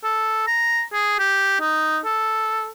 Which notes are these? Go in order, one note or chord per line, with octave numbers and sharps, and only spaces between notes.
A4
A#5
G#4
G4
D#4
A4